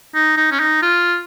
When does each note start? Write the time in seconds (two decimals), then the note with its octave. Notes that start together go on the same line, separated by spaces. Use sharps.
0.15 D#4
0.37 D#4
0.52 C#4
0.60 D#4
0.82 F4